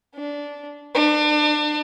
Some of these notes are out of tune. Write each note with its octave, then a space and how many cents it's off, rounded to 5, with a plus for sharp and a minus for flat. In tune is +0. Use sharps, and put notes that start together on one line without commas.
D4 -15
D4 +35